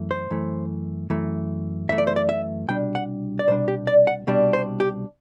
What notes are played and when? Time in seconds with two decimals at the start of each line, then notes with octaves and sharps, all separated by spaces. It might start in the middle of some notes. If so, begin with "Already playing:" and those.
Already playing: F#2 E3 A3
0.11 C5
0.30 F#2 E3 A3
1.10 F#2 E3 A3
1.89 F#2 E3 A3 E5
1.98 D5
2.07 C5
2.16 D5
2.29 E5
2.68 C2 B2 G3 D4 G5
2.95 F#5
3.39 D5
3.47 C2 B2 G3 D4 C5
3.68 G4
3.87 D5
4.07 F#5
4.27 C2 B2 G3 D4
4.53 C5
4.80 G4